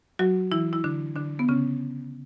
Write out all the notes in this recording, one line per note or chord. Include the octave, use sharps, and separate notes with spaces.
F#3 F#4
E3 E4
E4
D3 D4
D3 D4
B3
C#3 C#4